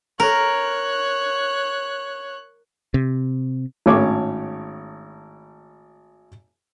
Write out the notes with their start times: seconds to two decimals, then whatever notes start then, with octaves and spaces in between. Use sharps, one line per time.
0.20 A#4 C#5 F#6
2.94 C3
3.86 G#1 A2 C#4 C#5 D6